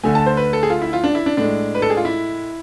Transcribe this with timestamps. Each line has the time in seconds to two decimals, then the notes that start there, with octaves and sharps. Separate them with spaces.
0.03 D2 D3 A3 G#5
0.15 A5
0.26 C5
0.37 B4
0.53 A4
0.63 G#4
0.70 F4
0.82 E4
0.93 F4
1.04 D4
1.15 E4
1.26 D4
1.37 A2 G#3 D4
1.75 B4
1.82 A4
1.90 G#4
1.97 F4
2.05 E4